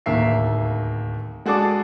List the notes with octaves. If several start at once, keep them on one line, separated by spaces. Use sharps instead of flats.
D1 D#2 A#3 E5 C7
G#3 F#4 G#4 A4 D5 D6